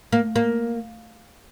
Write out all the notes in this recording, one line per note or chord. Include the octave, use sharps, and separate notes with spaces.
A#3
A#3